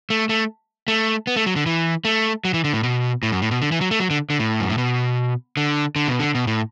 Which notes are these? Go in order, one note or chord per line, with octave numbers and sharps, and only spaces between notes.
A3
A3
A3
B3
A3
F#3
D3
E3
A3
F#3
E3
D3
A2
B2
A2
F#2
A2
B2
D3
E3
F#3
A3
F#3
D3
D3
A2
F#2
A2
B2
D3
D3
B2
D3
B2
A2